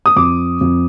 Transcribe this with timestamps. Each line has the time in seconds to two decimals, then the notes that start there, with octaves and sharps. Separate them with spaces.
0.06 D#6
0.16 F2 D6
0.61 F2